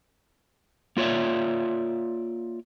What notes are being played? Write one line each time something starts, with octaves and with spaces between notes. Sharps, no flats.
A#3 F4 C#5 D5 E5